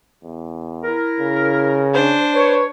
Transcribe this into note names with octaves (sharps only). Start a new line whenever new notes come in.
E2
E4 A#4
C#3
D4 C5
B4 C#5